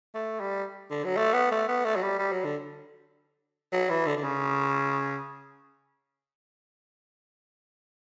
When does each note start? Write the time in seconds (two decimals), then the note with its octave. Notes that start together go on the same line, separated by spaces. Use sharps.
0.15 A3
0.40 G3
0.91 D3
1.04 F#3
1.17 A3
1.34 B3
1.52 A3
1.68 B3
1.85 A3
1.96 F#3
2.03 G3
2.19 G3
2.32 F#3
2.44 D3
3.73 F#3
3.90 E3
4.07 D3
4.17 D3
4.24 C#3